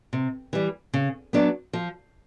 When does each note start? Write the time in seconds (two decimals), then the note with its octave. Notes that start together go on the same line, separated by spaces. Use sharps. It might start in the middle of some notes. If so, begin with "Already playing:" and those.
0.13 C3
0.53 E3 G3
0.94 C#3
1.33 F#3 B3 D4
1.73 F3